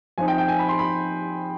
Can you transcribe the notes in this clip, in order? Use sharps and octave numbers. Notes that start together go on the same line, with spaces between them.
F3 C4 D#4 G#5
G5
G5
G#5
B5
C6
B5